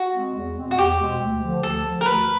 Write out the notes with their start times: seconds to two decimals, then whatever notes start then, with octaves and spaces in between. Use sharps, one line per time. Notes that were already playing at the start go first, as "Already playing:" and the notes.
Already playing: F#4
0.14 B2 G#3 C4
0.35 E2
0.57 B2 G#3 C4
0.71 F#4
0.78 E2 G4
0.99 B2 G#3 C4
1.21 D2
1.43 D3 F3
1.63 D2 A4
1.85 D3 F3
2.01 A#4
2.06 D2 B4